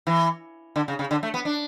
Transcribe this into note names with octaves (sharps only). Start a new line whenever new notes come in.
E3
D3
C#3
C#3
D3
A3
B3
D4